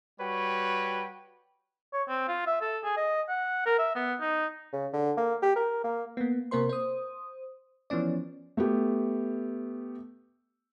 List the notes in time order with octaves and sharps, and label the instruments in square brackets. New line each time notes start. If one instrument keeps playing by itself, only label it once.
[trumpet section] G3 F#4 B4 C#5 G5
[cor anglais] C#5
C4
F4
E5
A4
G#4
D#5
F#5
A#4
E5
B3
D#4
[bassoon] C#3
D3
A#3
G4
A#4
A#3
[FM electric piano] A#3 B3
C3 A#3 A#4 C5 C6
C5 D#6
E3 F3 B3 C#4 D5
[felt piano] A3 B3 G4